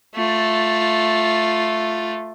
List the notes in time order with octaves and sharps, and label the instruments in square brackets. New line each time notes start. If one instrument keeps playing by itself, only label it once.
[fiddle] A3 F4